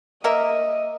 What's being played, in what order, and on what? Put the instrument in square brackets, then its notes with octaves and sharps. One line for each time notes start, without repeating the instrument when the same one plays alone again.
[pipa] A#3 A#4 E5 [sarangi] D#5